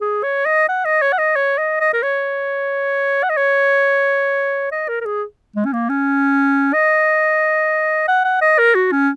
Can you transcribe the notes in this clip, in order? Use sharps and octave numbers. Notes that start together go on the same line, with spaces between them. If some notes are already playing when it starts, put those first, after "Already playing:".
G#4
C#5
D#5
F#5
D#5
C#5
F#5
D#5
C#5
D#5
D#5
A#4
C#5
F#5
D#5
C#5
D#5
A#4
A#4
G#4
G#3
C#4
A#3
C#4
D#5
F#5
F#5
D#5
A#4
F#4
C#4